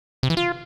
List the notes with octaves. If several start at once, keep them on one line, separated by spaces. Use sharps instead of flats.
C3
E3
F4